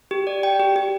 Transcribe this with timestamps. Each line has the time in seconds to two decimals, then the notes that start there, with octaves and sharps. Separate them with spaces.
0.11 G4
0.27 D5
0.43 G5
0.60 G4
0.76 G4